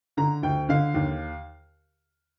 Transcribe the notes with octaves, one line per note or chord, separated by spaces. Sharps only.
D3 A#5
D2 G5
D3 F5
D#2